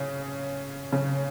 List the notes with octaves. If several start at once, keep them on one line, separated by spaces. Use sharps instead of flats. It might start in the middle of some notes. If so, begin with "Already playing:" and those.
Already playing: C#3
C#3